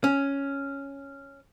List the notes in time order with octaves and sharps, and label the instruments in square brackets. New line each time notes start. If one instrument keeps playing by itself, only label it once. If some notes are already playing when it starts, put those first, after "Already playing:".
[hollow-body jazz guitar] C#4